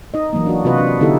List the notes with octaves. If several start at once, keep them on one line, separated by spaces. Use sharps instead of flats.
D#4 D#5
E3 F#3 A#3
D4 F#4
C3 F4 F#4 B4 D#5
D4
D3 B3 D#4 E4 G4 A4